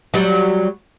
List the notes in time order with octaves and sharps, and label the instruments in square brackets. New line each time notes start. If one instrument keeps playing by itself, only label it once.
[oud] F#3 G3